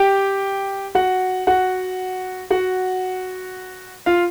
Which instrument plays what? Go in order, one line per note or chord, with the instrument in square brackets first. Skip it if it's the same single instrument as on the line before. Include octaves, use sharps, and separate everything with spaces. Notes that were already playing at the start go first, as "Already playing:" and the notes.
Already playing: [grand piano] G4 G5
F#4 F#5
F#4 F#5
F#4 F#5
F4 F5